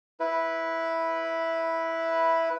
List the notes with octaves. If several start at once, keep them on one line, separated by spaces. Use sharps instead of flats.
E4 B4